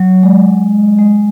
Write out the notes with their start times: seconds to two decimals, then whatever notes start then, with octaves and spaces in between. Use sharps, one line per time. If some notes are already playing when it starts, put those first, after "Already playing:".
Already playing: F#3
0.23 G#3
0.99 G#3